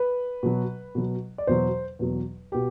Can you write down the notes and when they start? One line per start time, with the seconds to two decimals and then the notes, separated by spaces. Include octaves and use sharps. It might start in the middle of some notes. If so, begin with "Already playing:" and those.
Already playing: B4
0.43 B2 F#3
0.95 B2 F#3
1.38 D5
1.47 E2 B2 F#3 C5
1.99 E2 B2 F#3
2.52 B2 G4